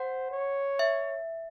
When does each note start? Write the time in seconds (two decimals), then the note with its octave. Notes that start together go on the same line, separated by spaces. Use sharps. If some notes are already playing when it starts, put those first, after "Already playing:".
Already playing: C5 F#5
0.31 C#5
0.79 E5